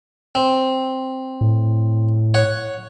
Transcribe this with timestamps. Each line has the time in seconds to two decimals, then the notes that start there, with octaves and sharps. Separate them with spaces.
0.35 C4
1.41 A2
2.34 C#5 F#5